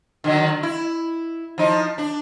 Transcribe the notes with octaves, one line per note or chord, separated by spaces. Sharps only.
D3 D#3 F#3
E4
F3 D#4
D4